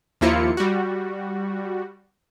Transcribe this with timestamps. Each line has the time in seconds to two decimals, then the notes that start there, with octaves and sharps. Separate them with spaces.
0.21 D#2 F3 A#3 E4 F4 C#7
0.57 G3 F#4